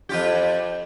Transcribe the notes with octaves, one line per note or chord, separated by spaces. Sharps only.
F2 F4 G4